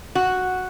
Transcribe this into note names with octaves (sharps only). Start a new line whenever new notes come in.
F#4